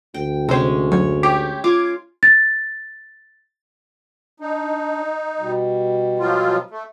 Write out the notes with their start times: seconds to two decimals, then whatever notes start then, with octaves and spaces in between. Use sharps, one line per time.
0.14 D2 G5
0.49 C3 G#3 C#4 C5
0.92 F#2 C#5
1.23 G4 C#5
1.64 F4 D6 G#6
2.23 A6
4.40 D4 D#4
5.40 B2 G3
6.19 F3 F#3 F4
6.70 A3